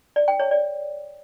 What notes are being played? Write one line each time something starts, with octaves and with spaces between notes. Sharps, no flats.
D5
G5
C#5
D5